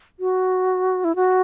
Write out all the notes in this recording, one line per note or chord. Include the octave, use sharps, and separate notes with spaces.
F#4
E4
F#4